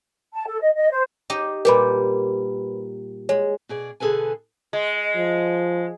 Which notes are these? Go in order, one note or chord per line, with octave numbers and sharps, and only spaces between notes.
A5
A4
D#5
D#5
C5
D#4 G4 D#5
A#2 G3 G4 A#4 B4 B5
G#3 C#5
B2 G#4 D5
B2 D3 G#4 A4 B4 G#5
G#3
F3